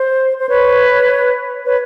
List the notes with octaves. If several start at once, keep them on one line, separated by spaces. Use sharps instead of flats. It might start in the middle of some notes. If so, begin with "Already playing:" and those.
Already playing: C5
C5
B4 C#5
B4 C#5